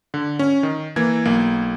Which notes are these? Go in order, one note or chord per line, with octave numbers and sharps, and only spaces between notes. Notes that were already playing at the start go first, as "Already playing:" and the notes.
D3
C#4
D#3
E3 A#3 G#6
B1 A#3